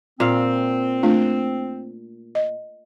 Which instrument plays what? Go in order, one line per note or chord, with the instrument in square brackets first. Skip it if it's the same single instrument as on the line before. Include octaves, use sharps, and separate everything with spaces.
[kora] A#2 F5 [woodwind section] C4
[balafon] A3 D4 F4
D#5